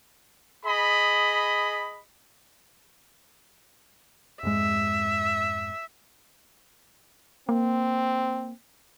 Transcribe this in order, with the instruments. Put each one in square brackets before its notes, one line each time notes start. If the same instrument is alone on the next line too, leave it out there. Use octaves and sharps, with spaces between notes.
[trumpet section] G#4 D#5 B5
[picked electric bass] F2 G#2 G#3 [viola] E5
[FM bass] A#3 [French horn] C4